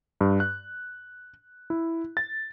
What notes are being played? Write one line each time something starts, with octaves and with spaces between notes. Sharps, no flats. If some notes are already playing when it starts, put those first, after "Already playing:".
G2
F#6
E4
A6